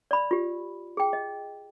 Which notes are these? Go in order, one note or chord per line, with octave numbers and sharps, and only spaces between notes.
D5 B5
F4 G4
G#4 G5
D#5